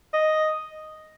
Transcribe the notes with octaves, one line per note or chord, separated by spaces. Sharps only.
D#5